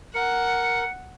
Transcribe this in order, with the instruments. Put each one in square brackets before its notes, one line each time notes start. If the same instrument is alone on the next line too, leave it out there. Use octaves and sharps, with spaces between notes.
[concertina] A#4 [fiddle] F#5 [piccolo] C#7